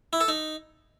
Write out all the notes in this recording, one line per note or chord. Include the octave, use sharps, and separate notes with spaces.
E4
A4
D#4